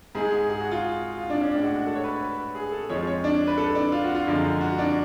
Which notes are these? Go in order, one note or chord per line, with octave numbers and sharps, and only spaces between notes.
G#2 G#3 G#4
G#4
G#4
F#4
F4
F4
D4
C#4
A2 G#3 D4
F#4
F#4
A4
C#5
B4
B4
G#4
A4
F2 F3 G#3 C#5
C#5
D4
B4
A4
D4
F4
F#4
F4
F#2 D3 F3 G#3
F#4
D4